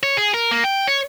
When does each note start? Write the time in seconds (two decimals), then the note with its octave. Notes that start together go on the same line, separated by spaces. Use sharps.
0.03 C#5
0.17 G#4
0.34 A#4
0.51 A#3
0.64 G5
0.87 C#5